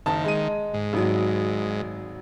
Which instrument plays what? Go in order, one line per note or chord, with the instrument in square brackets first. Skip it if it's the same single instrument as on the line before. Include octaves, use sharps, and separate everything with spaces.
[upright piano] F#1 A5 [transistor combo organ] D#3
[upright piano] G#3 D#7
[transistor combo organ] G#2
[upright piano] G#1 F#3